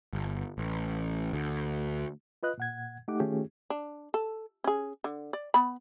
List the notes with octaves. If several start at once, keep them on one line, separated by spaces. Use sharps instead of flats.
G1
A1
D2
F4 B4 D#5 F#6
A#2 F#5 G#6
A3 D#4 G4 F#5 D6
D#3 A3 C#4 F4 G4 G#4
D4
A4
C#4 G#4
D3
D5
B3 B5